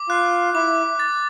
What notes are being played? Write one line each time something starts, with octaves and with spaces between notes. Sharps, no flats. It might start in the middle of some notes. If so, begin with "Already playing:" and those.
Already playing: D6
F4 F#6
E4 D6
A6